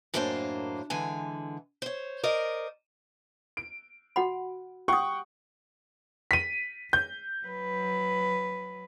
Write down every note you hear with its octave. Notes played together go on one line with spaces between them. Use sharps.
F#2 A2 A#3 D4 F#4 C5
D3 E3 G#3 G#5
C5 C#5
A#4 C5 D5 D#5
D7
F#4 F#5 B5
G4 F#5 G5 C#6 D#6
B6 D#7
G6
F#3 B4